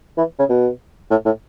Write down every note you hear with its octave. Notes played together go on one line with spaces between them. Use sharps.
E3
C#3
B2
A2
A2